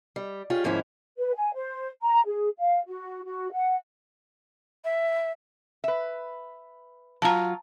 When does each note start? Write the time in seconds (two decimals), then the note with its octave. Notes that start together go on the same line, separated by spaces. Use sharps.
0.16 G3
0.50 C#4 F4 G4 G#4
0.64 D#2 G#2 F3 C#4 E4
1.18 B4
1.36 G#5
1.54 C5
2.03 A#5
2.27 G#4
2.59 F5
2.87 F#4
3.24 F#4
3.52 F#5
4.85 E5
5.84 B4 E5
7.22 F#3 F4 A5 A#5